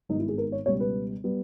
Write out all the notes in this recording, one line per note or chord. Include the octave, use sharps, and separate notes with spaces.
G#1 G2 D#3 G3 B3 D#4
E4
G#4
A#4
C#5
C#2 B2 G3 B3 C#5
B4
G3 B3